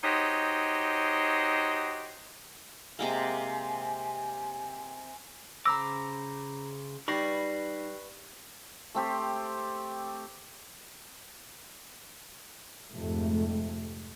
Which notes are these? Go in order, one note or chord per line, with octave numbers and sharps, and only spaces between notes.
D#4 F#4 G4 C5 C#5 D#5
C3 G#3 A#3 G#5
C#3 C5 A#5 B5 D6 E6 A#6
G3 D#4 B4 B5 C#6 A#6 C7
A3 C4 G4
F2 G#2 C3 A3